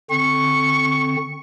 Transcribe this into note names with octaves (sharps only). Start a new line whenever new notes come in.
D3 C4 C#6